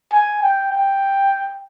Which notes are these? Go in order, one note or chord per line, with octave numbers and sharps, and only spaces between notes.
G#5
G5
G5